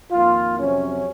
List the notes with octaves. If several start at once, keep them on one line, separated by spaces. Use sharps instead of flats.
F2 D#3 A#3 F4
F2 C3 F#3 C4 C#4